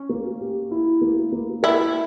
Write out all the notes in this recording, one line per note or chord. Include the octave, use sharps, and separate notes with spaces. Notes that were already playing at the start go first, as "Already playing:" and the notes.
Already playing: C#4
A#3
G4
E4
A#3
A#3
E4 A#4